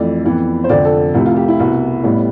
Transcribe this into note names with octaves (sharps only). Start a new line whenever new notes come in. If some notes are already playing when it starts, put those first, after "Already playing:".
Already playing: F2 E3 A3 D5
F2 E3 B3
C5
F1 F2 D3 D5
A4
C2 C3 F3 A3 E4
F4
G4
E4
C2 B2 B3
A1 A2 G3 B3